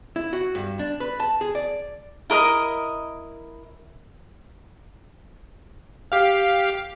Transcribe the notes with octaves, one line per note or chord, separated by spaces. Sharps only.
E4
F#4
G2
D4
B4
A5
G#4
D5
E4 A#4 D#5 D#6
G4 F5